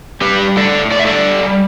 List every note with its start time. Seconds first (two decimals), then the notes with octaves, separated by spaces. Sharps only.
0.21 G3 G4 B4
0.39 G3
0.56 A2 A4 D5
0.74 A2
0.91 A2 D5
0.99 E5
1.06 G3 A4 D5
1.27 G3
1.43 G3